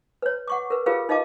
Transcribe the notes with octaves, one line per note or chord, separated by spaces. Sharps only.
B4 C#5
F#5 C#6 D6
A#4 B4
F4 G4 G#4 A#4 B4 F5
D#4 D#5 F5 A5 D6